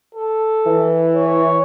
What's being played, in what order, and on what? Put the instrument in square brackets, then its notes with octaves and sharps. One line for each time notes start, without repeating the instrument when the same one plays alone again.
[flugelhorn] A4
[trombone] E3
[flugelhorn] C#5